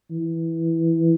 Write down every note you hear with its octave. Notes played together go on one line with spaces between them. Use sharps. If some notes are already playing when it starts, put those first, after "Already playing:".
E3